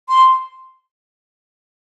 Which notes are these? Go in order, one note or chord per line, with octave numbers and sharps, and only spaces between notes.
C6